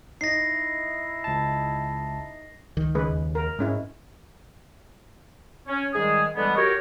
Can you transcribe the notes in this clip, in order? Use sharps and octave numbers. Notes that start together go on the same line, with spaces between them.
D#4 E4 A#6 C7
C#2 A5
C#2 D#3
C#3 G#3 B4
D#2
A#4
G#2 G#3 C#4 E4
C#4
G#2 D#3 G3 G#3 G#4
D3 E3 G3 G#3 B3
F#3 F#4 G4 A#4 C#5